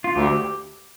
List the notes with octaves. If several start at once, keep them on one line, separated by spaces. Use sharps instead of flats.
F4
D2 G4